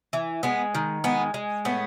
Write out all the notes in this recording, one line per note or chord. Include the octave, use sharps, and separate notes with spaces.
E3
G#3 B3
D#3
G#3 B3
G#3
A2 B3